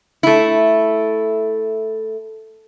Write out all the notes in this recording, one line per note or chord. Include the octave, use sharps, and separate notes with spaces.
A3 E4